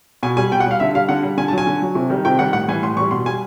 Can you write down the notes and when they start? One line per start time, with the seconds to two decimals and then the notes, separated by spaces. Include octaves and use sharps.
0.23 B2 G#5
0.37 G3 G#5
0.52 B2 G5
0.60 F#5
0.66 G3 F5
0.80 D3 E5
0.95 G3 F5
1.09 D3 F#5
1.23 G3
1.37 D3 G#5
1.48 A5
1.52 F#3
1.58 G#5
1.67 D3
1.82 F#3
1.95 C3
2.10 D#3 G3
2.25 C3 G5
2.39 D#3 G3 F#5
2.53 A2 F#5
2.68 E3 G3 G#5
2.82 A2 C6
2.96 E3 C#6
3.00 G3
3.11 B2 C6
3.26 G3 G#5